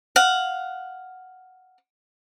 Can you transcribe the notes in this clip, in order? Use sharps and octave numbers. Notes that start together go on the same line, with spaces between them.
F5 F#5